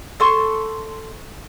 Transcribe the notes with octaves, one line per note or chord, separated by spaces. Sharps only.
A4 C6 C#6